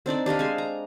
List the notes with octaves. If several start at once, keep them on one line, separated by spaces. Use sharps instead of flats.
C4 D4 D#4 D5
D4 G4 D#5 F5
G#3 C5 G#5
A#5